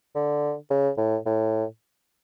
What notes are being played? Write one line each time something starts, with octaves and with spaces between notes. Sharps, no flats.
D3
C#3
A2
A2